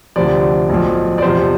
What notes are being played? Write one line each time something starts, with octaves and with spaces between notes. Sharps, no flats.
D2 C3 F3 D5
B1 A2 F3
D5
E2 C3 F3 C5